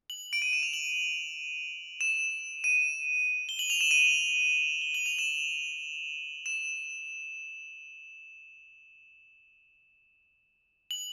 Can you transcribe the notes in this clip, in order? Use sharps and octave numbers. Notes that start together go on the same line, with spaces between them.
F#7
D7
D#7
E7
F7
F#7
E7
D#7
G7
F#7
F7
E7
D#7
G7
F#7
F7
E7
E7
F#7